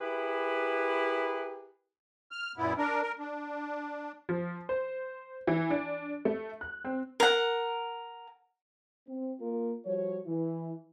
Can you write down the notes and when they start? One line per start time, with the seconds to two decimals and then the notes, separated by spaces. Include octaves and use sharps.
0.01 E4 G4 G#4 A#4 B4
2.31 F6
2.57 F#2 A#2 B3 E4
2.77 D4 A#4
3.02 A#4
3.18 D4
4.29 F3
4.69 C5
5.47 E3
5.70 D4
6.25 A3
6.61 F#6
6.85 C4
7.20 A#4 F#5
9.07 C4
9.40 A#3 F4 A#4
9.85 F3 G3 F#4 C#5
10.26 E3 E4